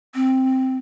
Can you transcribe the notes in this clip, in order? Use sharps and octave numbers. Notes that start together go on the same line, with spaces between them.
C4